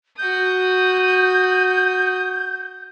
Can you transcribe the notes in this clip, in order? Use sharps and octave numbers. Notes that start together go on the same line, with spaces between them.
F#4 D#6 G6